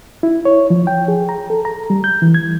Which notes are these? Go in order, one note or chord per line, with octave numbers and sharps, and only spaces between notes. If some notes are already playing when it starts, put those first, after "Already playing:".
E4
C#5
F3
G5
G#4
A#5
A4
A#5
G3
G6
E3
G#6